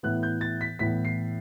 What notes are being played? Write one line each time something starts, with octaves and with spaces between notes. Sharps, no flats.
A2 E3 B3 F#6
G6
A6
B6
A2 E3 B3 B6
C7